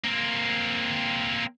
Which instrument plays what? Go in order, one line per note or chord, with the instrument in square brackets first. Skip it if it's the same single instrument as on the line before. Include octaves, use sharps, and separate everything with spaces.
[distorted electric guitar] A#3 C4